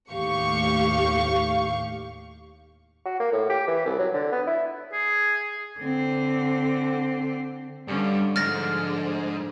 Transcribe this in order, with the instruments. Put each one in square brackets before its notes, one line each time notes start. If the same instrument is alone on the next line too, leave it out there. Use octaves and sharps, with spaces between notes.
[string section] D#2 A2 G4 F5 C#6
[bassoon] F#4
A#3
A2
G4
E3
C2
F#3
D3
B3
E4
[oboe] G#4
[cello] D3 C4
[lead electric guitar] G2 [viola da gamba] D3 C#4
[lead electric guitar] G#2 [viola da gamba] D3 F3 [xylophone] F6 A6 A#6